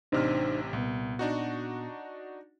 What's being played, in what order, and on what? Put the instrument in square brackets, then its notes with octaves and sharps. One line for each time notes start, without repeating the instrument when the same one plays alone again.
[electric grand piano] A1 C3 F6 [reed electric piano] D4 D#4 C5
[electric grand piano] C2 [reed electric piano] A#2 B3
[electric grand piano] D4 D#4 F#4